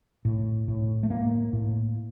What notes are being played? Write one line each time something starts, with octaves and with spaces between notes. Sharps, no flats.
A2
A2
A3
A2 A#3
A2